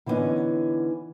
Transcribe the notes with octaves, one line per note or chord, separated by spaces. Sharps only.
D3 E3 G3 B3 C#4 D#4